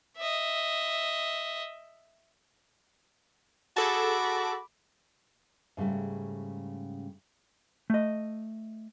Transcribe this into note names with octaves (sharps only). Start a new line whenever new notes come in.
D#5 E5
F#4 G#4 A4 A5 B5 D6
G#2 C#3 G3 A3
A3 D#5